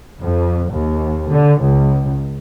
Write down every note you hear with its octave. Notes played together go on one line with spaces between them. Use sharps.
F2
D#2
D3
C#2